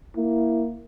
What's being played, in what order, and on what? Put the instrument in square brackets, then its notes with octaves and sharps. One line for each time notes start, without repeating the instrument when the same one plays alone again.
[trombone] A#3 [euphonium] E4